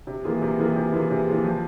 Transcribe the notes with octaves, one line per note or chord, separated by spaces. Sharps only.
C3
E3 A#3 F4 G#4
C3
E3 A#3 F4 G#4
C3
E3 A#3 F4 G#4
C3
E3 A#3 F4 G#4
F3